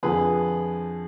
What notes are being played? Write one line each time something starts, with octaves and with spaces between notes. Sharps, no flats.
F2 D3 F3 G#4 B4